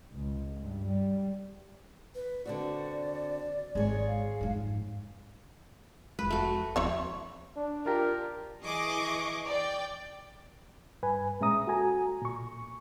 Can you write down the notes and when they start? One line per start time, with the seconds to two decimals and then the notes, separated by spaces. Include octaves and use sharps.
0.13 C#2
0.60 G2
0.90 G3
2.15 B4
2.45 D3 C4 F#4 D5
3.75 G#1 G#3 G#4 C#5
4.07 F5
4.41 F2 G#2
6.19 F1 G#3 B4
6.30 A3 F#4
6.76 D#1 F3 C4 E4 C#5
7.57 D4
7.86 F4 G4 A#4
8.63 E3 G#4 D#5 C#6 D6
9.47 D5 G5
11.03 G2 B4 G#5
11.40 A#2 G#3 C#4 E5 A#5 D#6
11.67 F#4 A4 G#5 A#5
12.22 A#2 C#6